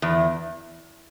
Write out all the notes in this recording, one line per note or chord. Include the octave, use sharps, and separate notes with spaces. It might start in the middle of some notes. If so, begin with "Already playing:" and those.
E2